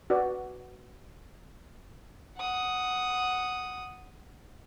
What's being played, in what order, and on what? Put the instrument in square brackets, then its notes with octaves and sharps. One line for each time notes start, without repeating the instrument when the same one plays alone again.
[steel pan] F#4 B4 D5
[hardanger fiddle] F#5 D#6